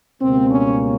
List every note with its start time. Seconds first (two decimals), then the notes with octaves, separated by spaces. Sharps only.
0.21 C#2 B2 G3 A#3 C4
0.51 C#4